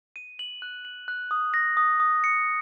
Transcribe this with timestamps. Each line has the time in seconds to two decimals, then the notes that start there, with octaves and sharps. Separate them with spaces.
0.16 D#7
0.39 F#7
0.62 F#6
0.85 F#7
1.08 F#6
1.31 D#6
1.54 A#6
1.77 D#6
2.00 D#6
2.24 C#7